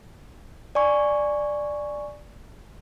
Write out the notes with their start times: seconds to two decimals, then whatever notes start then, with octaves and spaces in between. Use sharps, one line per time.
0.75 D5 G#5 C#6